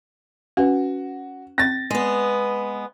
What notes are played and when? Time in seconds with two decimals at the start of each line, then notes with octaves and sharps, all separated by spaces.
0.57 C#4 F#4 B4
1.58 C4 A6 A#6
1.90 G#3 B3